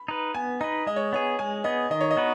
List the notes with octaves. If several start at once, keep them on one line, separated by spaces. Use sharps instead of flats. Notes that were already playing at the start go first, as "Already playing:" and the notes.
Already playing: B5
D#4 B4
B3 G#5
D#4 B4 D#5
G#3 D#5
C#5
B3 G#4 C#5
G#3 G#5
B3 G#4 D#5
D#3 D#5
C#5
D#5
B3 D#4 F#4 B4